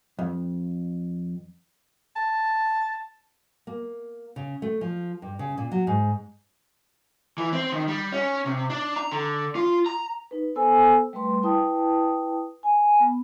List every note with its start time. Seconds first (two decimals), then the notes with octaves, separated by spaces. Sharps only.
0.19 F2
2.16 A5
3.67 A#3
4.36 C#3
4.62 A3
4.81 F3
5.22 G2
5.39 C#3
5.57 A#2
5.72 F#3
5.87 G#2
7.38 E3
7.52 C4
7.72 D#3
7.88 G3
8.12 C#4
8.46 C3
8.70 D4
8.96 A#5
9.11 D3
9.55 F4
9.86 A#5
10.31 D#4 B4
10.56 B3 A4 C5 G#5 E6
11.13 G3 A3 B4 C6
11.43 E4 B4 G5 A5 D#6
12.63 G#5
13.00 B3